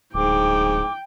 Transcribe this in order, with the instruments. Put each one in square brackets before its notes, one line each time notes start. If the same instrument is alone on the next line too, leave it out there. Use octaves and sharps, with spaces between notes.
[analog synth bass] D1 [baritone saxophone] G#2 [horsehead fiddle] G5 [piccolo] D6